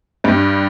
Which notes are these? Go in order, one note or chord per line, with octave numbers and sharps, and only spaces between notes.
G2 G3